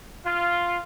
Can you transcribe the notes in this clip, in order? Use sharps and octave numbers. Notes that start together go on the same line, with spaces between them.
F4